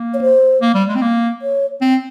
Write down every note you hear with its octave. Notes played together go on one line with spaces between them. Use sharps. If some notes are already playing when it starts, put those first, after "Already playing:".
Already playing: A#3
C#5
C5
A#3
G3
G#3
C4
A#3
C#5
C4